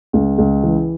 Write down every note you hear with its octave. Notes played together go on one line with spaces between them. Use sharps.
C#2
C#2
E3